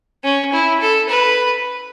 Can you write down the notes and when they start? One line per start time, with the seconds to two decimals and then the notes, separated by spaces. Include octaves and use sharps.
0.24 C#4
0.53 E4
0.81 A4
1.09 B4